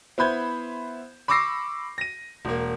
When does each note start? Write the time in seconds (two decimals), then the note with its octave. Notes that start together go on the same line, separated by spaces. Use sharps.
0.18 B3 E4 C5 B5 G6 G#6
1.28 B5 C#6 D6 E6 A#6 C7
1.98 A#6 D#7
2.45 E1 A#3